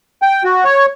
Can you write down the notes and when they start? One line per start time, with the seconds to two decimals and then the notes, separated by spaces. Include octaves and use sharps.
0.22 G5
0.44 F#4
0.64 C#5